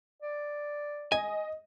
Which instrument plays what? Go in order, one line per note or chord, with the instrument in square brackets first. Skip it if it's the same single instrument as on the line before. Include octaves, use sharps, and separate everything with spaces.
[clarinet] D5
[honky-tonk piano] D#5 [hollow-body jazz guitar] G#5